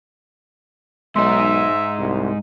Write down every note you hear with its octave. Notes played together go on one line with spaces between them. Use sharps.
B1 G#2 D#4 E5 C6
C2